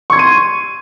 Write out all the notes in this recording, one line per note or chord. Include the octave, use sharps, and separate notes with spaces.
C6 C#6 G#6 D#7